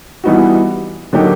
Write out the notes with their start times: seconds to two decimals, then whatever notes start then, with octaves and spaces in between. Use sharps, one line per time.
0.24 E3 G3 B3 D#4 F#4
1.13 D3 F#3 A#3 D#4 G4